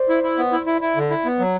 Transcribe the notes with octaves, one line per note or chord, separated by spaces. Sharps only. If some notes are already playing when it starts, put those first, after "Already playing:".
Already playing: C5 D5
E4
E4
B3
E4
E4
E4
D3
E4
B3
F#3